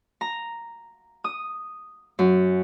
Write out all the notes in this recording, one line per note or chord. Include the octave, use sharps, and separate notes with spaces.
A#5
D#6
F#2